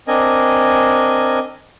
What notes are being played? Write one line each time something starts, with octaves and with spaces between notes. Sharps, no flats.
C4 D4 A#4 D#5 G#5